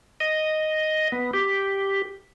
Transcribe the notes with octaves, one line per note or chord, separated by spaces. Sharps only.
D#5
B3
G4